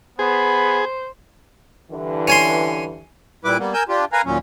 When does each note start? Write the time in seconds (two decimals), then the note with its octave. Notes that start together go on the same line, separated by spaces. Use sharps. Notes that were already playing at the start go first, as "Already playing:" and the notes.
0.19 B3 G#4 C5 B5
1.90 G2 D3 E3
2.27 C#4 G#5 C6
3.45 A#2 G3 E4 B4 D6
3.59 G3 A#3 B3
3.74 A#4 G#5 E6 G6
3.89 D4 F4 G4
4.13 A#4 B4 F5 G#5 A#5
4.25 D#2 A#2 F#3 C#4